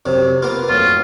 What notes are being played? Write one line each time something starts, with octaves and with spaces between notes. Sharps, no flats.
F#2 C3
A#3 B3 F4
F#2 A2 F4